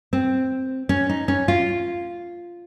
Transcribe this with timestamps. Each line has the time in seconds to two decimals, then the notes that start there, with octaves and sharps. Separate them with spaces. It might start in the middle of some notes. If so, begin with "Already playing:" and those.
0.13 C4
0.89 C#4
1.09 D#4
1.28 C#4
1.48 F4